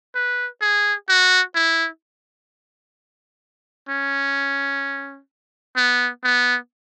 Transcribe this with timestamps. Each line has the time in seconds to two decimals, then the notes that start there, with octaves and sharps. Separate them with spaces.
0.15 B4
0.61 G#4
1.09 F#4
1.55 E4
3.89 C#4
5.76 B3
6.24 B3